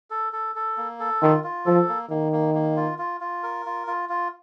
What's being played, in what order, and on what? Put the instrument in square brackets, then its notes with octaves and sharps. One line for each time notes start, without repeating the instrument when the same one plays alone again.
[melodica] A4
A4
A4
A#3
A4
[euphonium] D#3 [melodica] F4
[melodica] F4
[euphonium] F3 [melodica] A4
[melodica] A#3
[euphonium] D#3 [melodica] A#3
[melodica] A#3
A#3
F4
F4
F4
A#4
F4
F4
F4